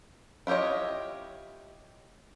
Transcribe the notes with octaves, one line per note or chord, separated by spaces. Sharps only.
E4 F4 G4 C#5 D#5